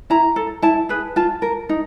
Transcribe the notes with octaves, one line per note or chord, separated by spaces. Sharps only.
E4 A#5
A4
E4 A5
G#4 B4
F4 A5
A#4
D#4